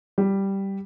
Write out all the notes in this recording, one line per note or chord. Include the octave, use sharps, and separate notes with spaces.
G3